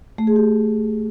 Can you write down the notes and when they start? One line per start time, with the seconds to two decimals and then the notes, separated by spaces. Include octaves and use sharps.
0.18 A3
0.27 G#4
0.36 G4